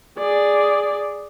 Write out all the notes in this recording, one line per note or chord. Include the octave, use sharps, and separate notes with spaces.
G#4 D5